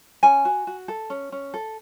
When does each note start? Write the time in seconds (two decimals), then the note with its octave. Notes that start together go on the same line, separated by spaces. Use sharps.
0.23 C#4 G#5
0.45 F#4
0.67 F#4
0.88 A4
1.10 C#4
1.32 C#4
1.54 A4